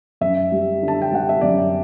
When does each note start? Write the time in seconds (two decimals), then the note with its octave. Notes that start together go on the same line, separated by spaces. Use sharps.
0.21 F#2 E5
0.52 G3
0.82 D3
0.88 A5
1.02 G5
1.12 G3 F#5
1.29 E5
1.41 F#2 D5